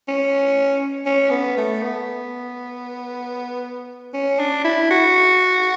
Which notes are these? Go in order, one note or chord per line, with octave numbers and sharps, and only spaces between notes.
C#4
C#4
B3
A3
B3
C#4
D4
E4
F#4